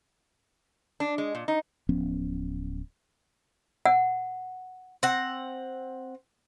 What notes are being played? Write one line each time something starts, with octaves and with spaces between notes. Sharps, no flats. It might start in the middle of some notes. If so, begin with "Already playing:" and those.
D4
G#3
A#2
D#4
D1 F3 B3 C#4
F#5
C4 F#5